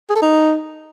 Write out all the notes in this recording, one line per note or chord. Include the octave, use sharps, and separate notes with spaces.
G#4
A4
D#4